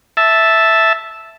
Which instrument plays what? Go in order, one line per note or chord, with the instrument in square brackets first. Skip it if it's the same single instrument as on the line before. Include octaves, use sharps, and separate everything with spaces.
[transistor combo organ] E5 A5